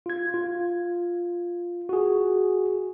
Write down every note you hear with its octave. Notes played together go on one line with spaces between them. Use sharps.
F4 G#6
F4
F#4 G#4